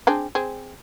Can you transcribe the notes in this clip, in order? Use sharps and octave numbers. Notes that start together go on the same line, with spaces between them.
C4 D4 G#4
C4 G#4